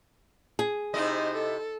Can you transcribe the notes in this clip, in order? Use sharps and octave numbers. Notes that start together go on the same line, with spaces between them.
G#4
C3 D#4 E4 C5 D#5
A4